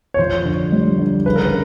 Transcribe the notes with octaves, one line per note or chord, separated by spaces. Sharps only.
C#5
F2 C5
D3
G3
D3
C#3 B4
A#4
B4